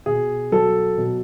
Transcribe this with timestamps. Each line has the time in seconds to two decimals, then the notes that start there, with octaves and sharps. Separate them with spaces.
0.06 B2 G#4
0.52 F#3 A4
0.97 B2